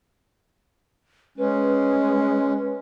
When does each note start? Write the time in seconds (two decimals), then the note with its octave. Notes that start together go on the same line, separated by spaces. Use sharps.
1.38 G#3 C#4 B4